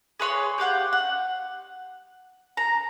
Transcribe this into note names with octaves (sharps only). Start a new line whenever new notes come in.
G#4 B4 C#5 C6
G4 F5 F#5 G6
F#5
A#5